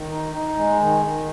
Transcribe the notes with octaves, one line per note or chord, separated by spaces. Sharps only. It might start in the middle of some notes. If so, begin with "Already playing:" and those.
Already playing: D#3
D#4
D#4
G#3
D#3
D#3